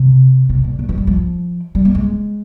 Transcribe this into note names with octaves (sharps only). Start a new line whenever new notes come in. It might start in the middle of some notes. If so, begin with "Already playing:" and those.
Already playing: C3
C3
A#2
A#2
E3
G3
F3
G3
A#3
G#3